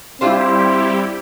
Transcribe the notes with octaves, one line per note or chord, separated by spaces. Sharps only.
G3 C4 D4 E4 F4 G4 C5